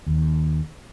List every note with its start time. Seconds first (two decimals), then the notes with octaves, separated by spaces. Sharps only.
0.06 D#2